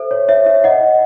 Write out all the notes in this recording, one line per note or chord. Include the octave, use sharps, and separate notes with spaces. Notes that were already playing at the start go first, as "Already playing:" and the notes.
Already playing: A4 C5 E5
C#5
C#5 E5
C#5 E5
D#5 F#5